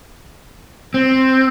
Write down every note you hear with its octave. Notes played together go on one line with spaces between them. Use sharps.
C4